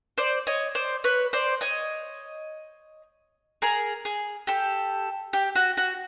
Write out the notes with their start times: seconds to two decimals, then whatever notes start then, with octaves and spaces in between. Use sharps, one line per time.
0.18 C5 D5
0.47 C#5 D#5
0.75 C5 D5
1.04 B4 C#5
1.33 C5 D5
1.61 C#5 D#5
3.62 G#4 A#4
4.05 G#4
4.47 G4 A4
5.33 G4
5.55 F#4
5.77 F#4